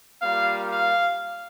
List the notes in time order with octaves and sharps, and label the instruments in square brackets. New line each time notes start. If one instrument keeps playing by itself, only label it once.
[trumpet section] G3 A#3 F4 F5
F5